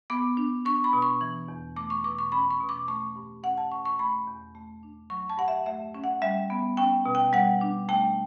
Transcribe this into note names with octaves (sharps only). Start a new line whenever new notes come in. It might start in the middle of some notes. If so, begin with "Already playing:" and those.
B3 D6
D4
D4 C#6
B5
B2
C#6
E3
E2
A3 D6
C#6
B2 D6
C#6
C#4 B5
C#6
B2
D6
A3 C#6
G2
C#4 F#5
A5
B2 C#6
C#6
A3 B5
E2
A3
D4
F#3 C#6
A5
G2 F#5
E5
A3 E5
C#4
F#5
G3 E5
B3
C#4 G5
B2
G5
G3 F#5
D4
A3 G5